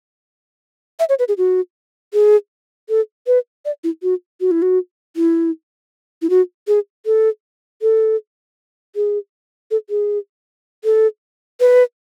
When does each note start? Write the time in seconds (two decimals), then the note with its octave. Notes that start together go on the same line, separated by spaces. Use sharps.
0.99 E5
1.09 C#5
1.19 B4
1.28 G#4
1.38 F#4
2.13 G#4
2.89 A4
3.27 B4
3.65 D5
3.84 E4
4.03 F#4
4.41 F#4
4.51 E4
4.62 F#4
5.16 E4
6.22 E4
6.30 F#4
6.67 G#4
7.06 A4
7.82 A4
8.95 G#4
9.71 A4
9.90 G#4
10.84 A4
11.60 B4